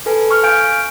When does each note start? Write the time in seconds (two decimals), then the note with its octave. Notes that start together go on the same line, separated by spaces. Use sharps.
0.06 A4 B4 G#5
0.31 C#6 F6
0.43 F5 G#5 F6 G6 D7